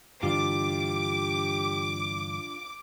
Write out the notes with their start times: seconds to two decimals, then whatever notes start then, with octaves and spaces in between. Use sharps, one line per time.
0.23 G2 D3 E3 D4 F4 G4 D6